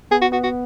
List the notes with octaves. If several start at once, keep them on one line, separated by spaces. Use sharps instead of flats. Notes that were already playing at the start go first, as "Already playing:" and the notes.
B3 G#4
F#4
B3 F#4
F#4